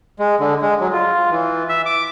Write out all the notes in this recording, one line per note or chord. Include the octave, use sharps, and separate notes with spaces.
G#3
D3
G#3
F#3
F4
E3
E5
D6